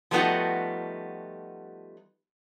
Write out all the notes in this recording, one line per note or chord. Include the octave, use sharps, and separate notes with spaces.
F3 G3 A3 B3 D#4 F#4